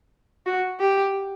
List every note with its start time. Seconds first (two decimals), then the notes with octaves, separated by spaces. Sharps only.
0.46 F#4
0.80 G4